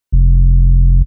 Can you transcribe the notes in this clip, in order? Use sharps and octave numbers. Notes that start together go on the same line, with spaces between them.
F1